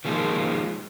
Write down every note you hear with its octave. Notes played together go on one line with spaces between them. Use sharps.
D#3 F3 G#3 A#3